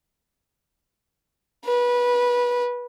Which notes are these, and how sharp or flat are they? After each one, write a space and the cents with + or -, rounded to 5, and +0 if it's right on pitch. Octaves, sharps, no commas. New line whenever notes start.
B4 -20